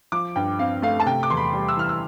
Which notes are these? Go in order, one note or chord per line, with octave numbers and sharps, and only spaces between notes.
F3 D6
G2 G5
C4 F5
A3 F5
A5
C3 G5
D6
E2 C6
B5
G3
E6
E3 F6
E6